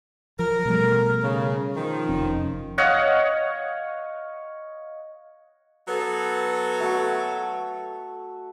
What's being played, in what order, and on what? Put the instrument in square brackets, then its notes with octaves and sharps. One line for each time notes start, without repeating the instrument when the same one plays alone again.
[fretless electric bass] F3 [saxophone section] A#4
[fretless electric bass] B2 G3 A3
[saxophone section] C#3
D#3 F3
[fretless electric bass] F1 C#4
[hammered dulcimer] C#5 D#5 F5 F#5
[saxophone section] F#3 B3 A4
[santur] A3 F#4 F#5